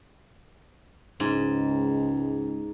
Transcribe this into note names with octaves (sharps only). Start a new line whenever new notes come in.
C#2 G#2